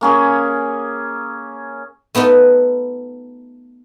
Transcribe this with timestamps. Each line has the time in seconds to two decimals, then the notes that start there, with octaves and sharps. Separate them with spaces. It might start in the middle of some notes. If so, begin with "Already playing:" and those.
0.01 A#3 C#4 G#4
2.15 A3 B3 D#4 F4